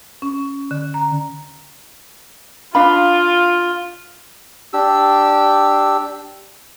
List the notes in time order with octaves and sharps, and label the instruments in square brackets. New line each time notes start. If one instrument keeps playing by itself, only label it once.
[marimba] C#4
D3
A#5
[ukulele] D4 F5 B5 [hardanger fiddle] F4
[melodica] D4 G4 E6